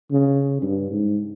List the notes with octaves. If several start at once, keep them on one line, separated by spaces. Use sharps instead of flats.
C#3
G2
G#2